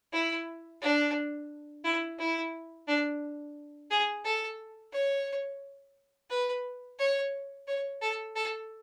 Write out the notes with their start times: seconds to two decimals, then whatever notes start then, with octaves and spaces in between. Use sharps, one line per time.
0.13 E4
0.81 D4
1.84 E4
2.19 E4
2.88 D4
3.91 G#4
4.25 A4
4.93 C#5
6.30 B4
6.99 C#5
7.68 C#5
8.02 A4
8.36 A4